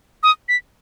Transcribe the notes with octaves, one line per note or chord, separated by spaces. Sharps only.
D#6
B6